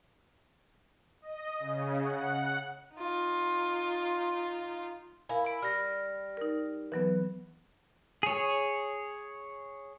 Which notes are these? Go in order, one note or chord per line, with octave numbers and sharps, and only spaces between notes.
D#5
C#3
F#5
D#4 F4
E4 A#4 F5 G#5
B5 D7
G3 F6 A#6
D#4 A#4
E3 F#3 B3 B4
G#4 C#5